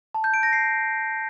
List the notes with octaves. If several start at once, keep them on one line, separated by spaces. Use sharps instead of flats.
A5
G6
D7
A#6
C7